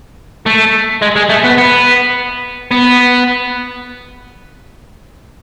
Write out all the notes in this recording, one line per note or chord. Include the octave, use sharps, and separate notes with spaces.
A3
G#3
G#3
A3
B3
B3
B3